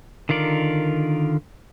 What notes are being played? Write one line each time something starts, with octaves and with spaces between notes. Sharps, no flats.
D3 D#3 F4 A#4 D5